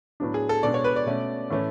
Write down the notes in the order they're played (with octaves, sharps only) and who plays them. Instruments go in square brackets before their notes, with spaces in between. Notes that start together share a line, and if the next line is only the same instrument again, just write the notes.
[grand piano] A2 F#3 B3 D4
G#4
A4
B2 G#3 D4 D5
C#5
B4
D5
B2 A3 C#4
A2 E3 A3 C#4